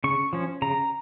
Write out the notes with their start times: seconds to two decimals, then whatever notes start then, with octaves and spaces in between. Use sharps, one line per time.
0.04 C#3 C#6
0.33 F3 C#4
0.62 C#3 A#5